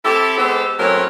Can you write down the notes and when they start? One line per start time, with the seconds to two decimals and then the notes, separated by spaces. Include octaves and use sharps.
0.05 C4 E4 G4 A4
0.37 G#3 B3 G4 A4 C5
0.79 A2 F#3 C4 C#4 A#4 C#5